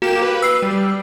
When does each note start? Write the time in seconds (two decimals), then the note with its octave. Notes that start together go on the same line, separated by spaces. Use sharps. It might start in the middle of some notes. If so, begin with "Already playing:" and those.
0.02 A#3 F#4 G4 E7
0.22 B4
0.42 E6 C7
0.62 G3